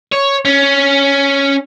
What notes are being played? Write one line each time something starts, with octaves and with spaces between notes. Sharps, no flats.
C#5
C#4